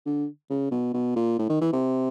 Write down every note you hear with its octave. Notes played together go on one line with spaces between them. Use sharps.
D3
C#3
B2
B2
A#2
A2
D#3
E3
C3